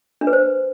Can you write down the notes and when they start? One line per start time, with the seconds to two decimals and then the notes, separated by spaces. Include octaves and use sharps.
0.21 D4
0.27 B4
0.33 C5